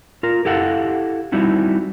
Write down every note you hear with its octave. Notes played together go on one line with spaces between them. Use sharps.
F4 A#4
E4 G4 A4 F5 F#5
G3 C4 D#4 E4 F#4